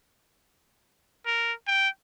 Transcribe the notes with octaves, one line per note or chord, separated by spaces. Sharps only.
A#4
G5